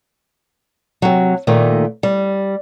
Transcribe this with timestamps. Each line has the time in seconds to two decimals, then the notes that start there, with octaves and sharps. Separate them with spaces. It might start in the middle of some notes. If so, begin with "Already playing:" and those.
1.02 C3 F#3
1.47 A#2 D#3 A3
2.03 G3